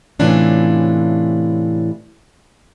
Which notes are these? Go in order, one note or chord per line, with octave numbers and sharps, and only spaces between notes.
A2 C3 E3 C#4 D4 F4